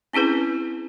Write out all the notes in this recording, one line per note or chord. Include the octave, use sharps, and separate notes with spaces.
C4 C#4 E4 G#4 B4